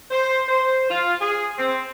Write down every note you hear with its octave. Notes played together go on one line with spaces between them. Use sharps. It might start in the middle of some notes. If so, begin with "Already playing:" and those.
C5
C5
F4
G#4
C4